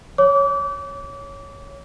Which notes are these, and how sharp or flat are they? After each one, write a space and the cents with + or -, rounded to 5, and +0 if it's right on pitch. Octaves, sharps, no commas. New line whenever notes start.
C#5 +0 D6 -30